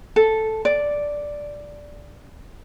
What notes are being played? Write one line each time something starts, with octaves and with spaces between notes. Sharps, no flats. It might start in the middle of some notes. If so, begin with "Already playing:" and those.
A4
D5